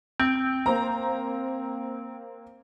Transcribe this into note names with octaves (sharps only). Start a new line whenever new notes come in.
C4 G6
A#3 C5 A#5